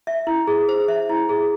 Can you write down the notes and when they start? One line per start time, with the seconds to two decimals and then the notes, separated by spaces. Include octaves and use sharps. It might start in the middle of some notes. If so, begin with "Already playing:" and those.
0.07 E5
0.27 E4
0.47 G#4
0.69 C5
0.88 E5
1.09 E4
1.29 G#4